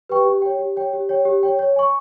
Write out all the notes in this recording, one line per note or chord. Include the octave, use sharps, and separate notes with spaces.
G4 B4 G5 C#6
G4
C#5 G5
G4
C#5 G5
G4
C#5 G5
G4
C#5 G5
C#5
G#5 C#6